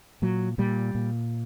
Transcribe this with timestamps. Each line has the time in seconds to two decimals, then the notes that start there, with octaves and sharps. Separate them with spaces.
0.22 A#2 F#3
0.58 A#2 G3
0.95 A#2